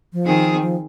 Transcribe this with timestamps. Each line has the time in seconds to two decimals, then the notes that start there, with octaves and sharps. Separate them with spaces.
0.13 F3
0.25 D#3 C4 G#4
0.61 F3